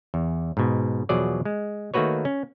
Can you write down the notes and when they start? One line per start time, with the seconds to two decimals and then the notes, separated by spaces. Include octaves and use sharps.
0.14 E2
0.57 G#2 B2
1.09 E2 B2 F3 F#3 G#4 D5
1.45 G#3
1.94 D#3 A3 A#3 F#4 B4 C#5
2.25 C#4